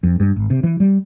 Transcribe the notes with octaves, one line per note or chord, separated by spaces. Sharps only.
F2
G2
G#1
C3
E3
G3